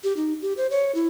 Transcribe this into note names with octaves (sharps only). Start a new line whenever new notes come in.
G4
D#4
G4
C5
C#5
E4